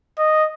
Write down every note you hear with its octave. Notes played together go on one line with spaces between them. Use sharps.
D#5